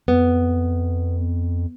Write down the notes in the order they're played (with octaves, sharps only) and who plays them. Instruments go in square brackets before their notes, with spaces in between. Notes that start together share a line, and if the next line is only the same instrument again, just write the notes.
[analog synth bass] F2 [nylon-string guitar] B3